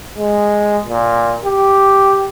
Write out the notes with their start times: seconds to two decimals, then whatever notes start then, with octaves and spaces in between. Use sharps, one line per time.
0.18 G#3
0.86 A#2
1.45 G4